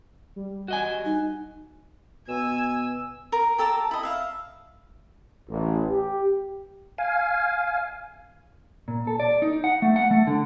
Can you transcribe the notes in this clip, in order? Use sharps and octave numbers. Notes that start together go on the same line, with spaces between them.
G3
F#4 D#5 G#5
D#4
B2 G#5 E6
A#4
G4 A4 A5 A#5
E4 D#5
E5 F5
A1
G4
F5 G#5
A#2
A4
D5
D#4
F#5
A3
F#5
A3
D3